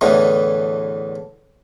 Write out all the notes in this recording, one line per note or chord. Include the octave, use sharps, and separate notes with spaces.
E2 A2 D3 E3